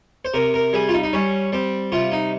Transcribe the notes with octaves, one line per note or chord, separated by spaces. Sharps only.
C5
C3 A#4
A#4
G3 G#4
F4
D#4
D#4
G3 C#4
G3 C4
C3 F4
D#4